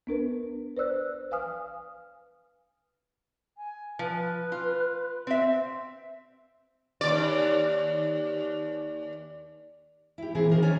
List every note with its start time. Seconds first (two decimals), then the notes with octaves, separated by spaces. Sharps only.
0.07 B3 D4 A#4 B4
0.77 B4 C5 D5 E6 F#6
1.31 B4 F5 G#5 D#6 F6
3.57 G#5
3.99 F3 B4
4.52 F4
5.27 C4 E5
7.01 D#2 D5
10.18 E4 G4
10.35 A#2 E3 C4 G#4
10.51 D#3 F3 G#4 A#4 C5
10.62 C#4 C#5 D5 G#5